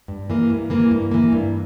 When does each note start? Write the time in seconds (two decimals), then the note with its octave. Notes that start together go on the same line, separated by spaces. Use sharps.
0.08 G2
0.30 E3 A#3
0.50 G2
0.70 E3 A#3
0.91 G2
1.11 E3 A#3
1.32 G2